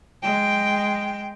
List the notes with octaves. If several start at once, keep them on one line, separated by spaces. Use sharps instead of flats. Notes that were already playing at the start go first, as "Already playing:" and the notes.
G#3 G5